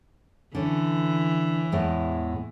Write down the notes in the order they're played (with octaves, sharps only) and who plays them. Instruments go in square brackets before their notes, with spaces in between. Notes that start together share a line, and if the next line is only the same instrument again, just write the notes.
[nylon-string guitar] D3 C#4 [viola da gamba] E3
[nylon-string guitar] E2 A2 G#3